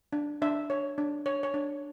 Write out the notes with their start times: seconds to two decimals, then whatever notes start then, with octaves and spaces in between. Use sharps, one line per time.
0.13 D4
0.42 D4 E5
0.70 C#5
0.98 D4
1.26 C#5
1.43 C#5
1.54 D4